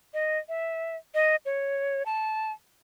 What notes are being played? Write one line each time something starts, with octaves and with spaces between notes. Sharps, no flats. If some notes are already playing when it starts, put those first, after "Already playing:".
D#5
E5
D#5
C#5
A5